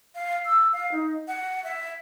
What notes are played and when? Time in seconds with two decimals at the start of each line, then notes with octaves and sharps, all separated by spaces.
0.15 F5
0.45 E6
0.73 F5
0.92 D#4
1.28 F#5
1.64 E5